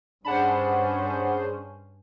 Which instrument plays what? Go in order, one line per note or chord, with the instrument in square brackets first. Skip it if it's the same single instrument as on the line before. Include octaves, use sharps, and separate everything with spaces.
[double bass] G2 C#4 [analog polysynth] D4 G#4 C5 [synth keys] F#5 A5 B5